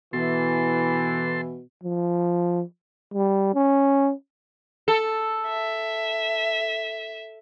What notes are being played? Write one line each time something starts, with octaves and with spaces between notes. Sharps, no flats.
B2 E3 A4 C6
F3
G3
C#4
A4
E5